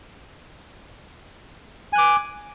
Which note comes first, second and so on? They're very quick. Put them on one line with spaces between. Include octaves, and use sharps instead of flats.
G#5 F#6 D6